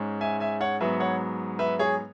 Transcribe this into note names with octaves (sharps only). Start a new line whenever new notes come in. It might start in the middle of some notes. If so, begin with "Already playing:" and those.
Already playing: G#2 G#3 C#4
E5 G#5
E5 G#5
C#5 F#5
G#2 F#3 B3 B4 E5
C#5 F#5
B4 E5
G#4 C#5